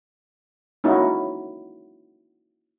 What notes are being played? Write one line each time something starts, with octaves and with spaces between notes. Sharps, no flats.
A#3 C#4 D#4 E4 F#4